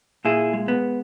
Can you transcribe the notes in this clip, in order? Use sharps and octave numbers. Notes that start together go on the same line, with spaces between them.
A#2 E4 G#4
G#3
B3